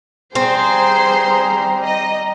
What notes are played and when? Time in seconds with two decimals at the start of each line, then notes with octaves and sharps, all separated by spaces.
0.35 G3 C4 G#4 C5 A#5 C6
1.84 D#5